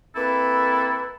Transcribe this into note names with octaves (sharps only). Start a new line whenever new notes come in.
A#3 C4 E4 A4 B4